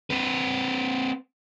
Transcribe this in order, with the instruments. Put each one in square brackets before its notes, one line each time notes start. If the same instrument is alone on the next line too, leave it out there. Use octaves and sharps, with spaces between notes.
[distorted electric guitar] C4 B4